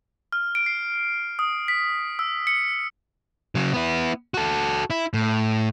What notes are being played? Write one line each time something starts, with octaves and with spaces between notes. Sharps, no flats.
F6
D7
C7
D#6
B6
E6
C#7
C#3 F#3
B3 E4
F#4 A4
E4
A2